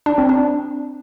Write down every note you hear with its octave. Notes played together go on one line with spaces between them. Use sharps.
D4
C4
D4